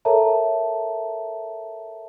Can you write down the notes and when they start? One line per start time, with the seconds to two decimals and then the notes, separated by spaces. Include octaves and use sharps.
0.05 A4 A#4 C#5 E5 A5 A#5